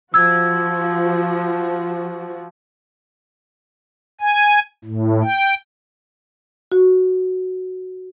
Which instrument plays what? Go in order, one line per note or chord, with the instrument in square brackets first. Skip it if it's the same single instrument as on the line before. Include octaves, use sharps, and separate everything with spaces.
[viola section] F3 F#4 [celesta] E6 G#6
[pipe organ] G#5
A2
G5
[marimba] F#4